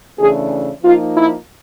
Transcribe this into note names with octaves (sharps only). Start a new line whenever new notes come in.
C#3 E3 A3 D4 G#4
F3 A#3 D#4 F4
E4